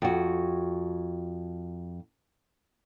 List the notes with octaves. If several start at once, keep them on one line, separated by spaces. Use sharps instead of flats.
F2 F#4